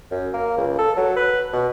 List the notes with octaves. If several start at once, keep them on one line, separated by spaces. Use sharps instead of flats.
F#2
A#3
C#2
A4
F#3
B4
B2